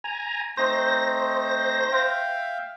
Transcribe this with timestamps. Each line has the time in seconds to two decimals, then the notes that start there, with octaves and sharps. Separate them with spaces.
0.04 G#5 A#5
0.57 A3 C4 D#4 C5 A#6
1.92 E5 F5 G5